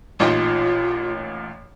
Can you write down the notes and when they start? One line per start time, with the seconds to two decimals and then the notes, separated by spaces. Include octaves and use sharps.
0.20 A1 A#2 D#4 F4